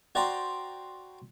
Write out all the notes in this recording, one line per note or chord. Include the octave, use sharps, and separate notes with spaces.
F#4 C5 D5 G5 A#5 C6